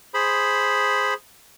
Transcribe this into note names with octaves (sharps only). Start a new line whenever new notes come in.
G#4 C5 B5